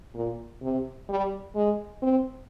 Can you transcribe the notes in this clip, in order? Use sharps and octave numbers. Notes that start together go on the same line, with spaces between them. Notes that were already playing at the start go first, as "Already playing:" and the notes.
A#2
C3
G3
G#3
C4